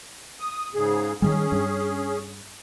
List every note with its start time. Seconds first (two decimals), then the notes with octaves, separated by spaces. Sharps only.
0.40 D#6
0.75 G#2 C#3 G#4
1.22 D#3 E3 G3 C#4 G#4
1.52 G2